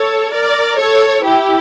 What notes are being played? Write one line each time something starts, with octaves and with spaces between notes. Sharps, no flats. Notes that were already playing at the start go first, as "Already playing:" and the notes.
Already playing: A4 C#5
A#4 D5
A4 C#5
E4 G4